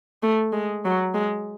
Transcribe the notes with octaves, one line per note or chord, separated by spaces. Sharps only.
A3
G#3
F#3
G#3